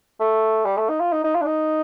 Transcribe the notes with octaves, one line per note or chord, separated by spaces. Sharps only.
A3
G3
A3
D#4
F4
D#4
D#4
F4
D4
D#4